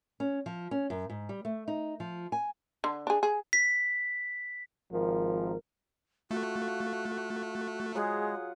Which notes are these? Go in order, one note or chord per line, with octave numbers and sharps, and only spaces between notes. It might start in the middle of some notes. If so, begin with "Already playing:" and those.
C#4
F3
C#4
F#2
G#2
G3
A3
D#4
F3
G#5
D3
D4 G#4
G#4
B6
G#1 F3 A#4
A3 F4 F#4
F#3 G#3 F4 G#4 F#5